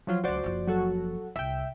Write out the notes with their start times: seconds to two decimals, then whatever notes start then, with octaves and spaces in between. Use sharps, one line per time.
0.07 F3 F#3 F4
0.24 C#2 F#3 F#4 C5 D5
0.44 F#1 F3
0.67 F#3 F#4 A4
1.36 C2 E5 G5